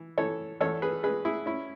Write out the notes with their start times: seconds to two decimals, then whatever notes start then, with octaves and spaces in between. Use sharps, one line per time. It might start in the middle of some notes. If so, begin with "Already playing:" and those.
Already playing: E3
0.18 E3 A4 C#5
0.61 E2 A4 C#5
0.82 G#4 B4
1.03 G#3 G#4 B4
1.25 E4 G#4
1.46 C#4 E4